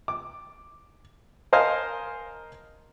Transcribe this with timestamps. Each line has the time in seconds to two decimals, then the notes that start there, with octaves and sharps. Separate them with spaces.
0.08 D6
1.53 A#4 C5 D#5 F5 G#5 A5